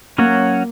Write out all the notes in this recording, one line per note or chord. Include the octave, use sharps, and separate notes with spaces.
F#3 A#3 C#4 F#4 C#5